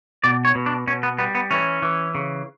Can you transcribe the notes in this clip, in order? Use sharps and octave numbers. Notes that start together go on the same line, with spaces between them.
B2 D5
C#5
B2
D4
B2 C#4
B3
G3 B3
B3
E3 C#4
E3
C#3